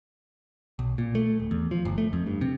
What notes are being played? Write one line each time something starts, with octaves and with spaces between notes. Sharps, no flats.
B1
A#2
A3
D1
E2
F3
G1
A3
F2
G2
C3